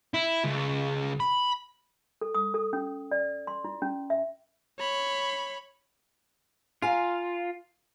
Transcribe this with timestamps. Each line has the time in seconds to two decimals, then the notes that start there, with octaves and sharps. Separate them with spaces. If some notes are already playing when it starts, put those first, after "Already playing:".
0.14 E4
0.44 C#2
1.20 B5
2.21 A4
2.35 D#6
2.54 A4
2.73 C#4
3.11 D5
3.47 C6
3.64 E4
3.82 C#4
4.10 E5
4.79 C#5 B5
6.82 F4 F5 G#5 A#5